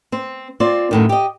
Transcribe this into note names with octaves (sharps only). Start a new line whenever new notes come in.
C4
C4 F4 D5
F#2 A2 D#3
G4 D#5